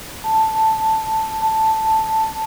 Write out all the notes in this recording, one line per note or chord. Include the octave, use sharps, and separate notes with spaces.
A5
A5